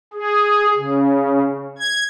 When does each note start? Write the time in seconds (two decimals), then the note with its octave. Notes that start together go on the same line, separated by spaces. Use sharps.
0.14 G#4
0.76 C#3
1.79 G#6